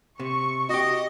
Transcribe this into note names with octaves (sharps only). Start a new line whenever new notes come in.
C3 C#6
F#4 G4 D#5